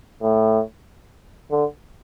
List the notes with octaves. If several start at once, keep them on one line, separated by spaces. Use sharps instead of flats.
A2
D3